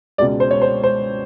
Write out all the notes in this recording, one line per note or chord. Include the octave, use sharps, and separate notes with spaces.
C#2 B2 G#3 D5
C5
C#5
C5
C5